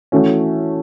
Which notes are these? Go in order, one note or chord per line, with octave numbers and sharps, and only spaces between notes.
E3 A3 C#4 F#4